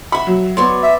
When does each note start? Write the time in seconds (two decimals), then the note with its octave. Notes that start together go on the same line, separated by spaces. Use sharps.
0.12 E5 F#5 B5
0.27 F#3
0.57 B3 C#5 D5 C6
0.83 E5